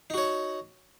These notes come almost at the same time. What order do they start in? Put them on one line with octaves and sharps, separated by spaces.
D#4 F#4 C#5